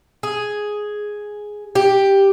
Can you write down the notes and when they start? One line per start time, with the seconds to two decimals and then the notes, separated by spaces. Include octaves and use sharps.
0.23 G#4
1.75 G4